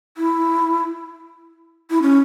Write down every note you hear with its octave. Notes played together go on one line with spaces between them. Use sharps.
E4
E4
C#4